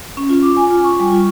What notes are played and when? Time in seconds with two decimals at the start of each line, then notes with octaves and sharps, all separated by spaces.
0.17 C#4
0.29 F4
0.43 D6
0.57 G#5
0.70 F4
0.84 C#6
1.00 G3
1.12 F4